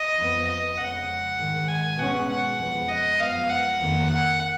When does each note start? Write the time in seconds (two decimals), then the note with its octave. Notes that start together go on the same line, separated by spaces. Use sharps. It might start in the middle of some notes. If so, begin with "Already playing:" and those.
Already playing: D#5
0.18 F2 F3 B3
0.47 D#5
0.78 F2 C#3 G#3 F#5
1.38 G#2 D#3 G#3
1.68 G#5
1.98 B2 G#3 C#4 F#5
2.29 F#5
2.58 F2 F3 G#3 B3
2.89 D#5
3.19 F#2 F3 G#3 B3 F5
3.49 F#5
3.80 F2 D#3 A#3
4.10 F#5